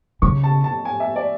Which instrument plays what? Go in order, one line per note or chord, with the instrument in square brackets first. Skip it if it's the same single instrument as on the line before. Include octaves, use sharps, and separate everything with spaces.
[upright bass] C#3 [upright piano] C#6
[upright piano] A5
A5
G#5
E5
D5